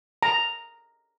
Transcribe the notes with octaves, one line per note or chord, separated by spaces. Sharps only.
A#5